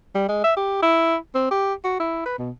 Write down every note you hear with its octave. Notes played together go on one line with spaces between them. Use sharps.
G3
G#3
E5
G4
E4
C4
G4
F#4
E4
B4
B2